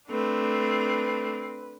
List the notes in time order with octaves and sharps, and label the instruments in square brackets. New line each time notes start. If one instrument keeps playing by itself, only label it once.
[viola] A3 D4 [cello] C4 [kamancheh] B4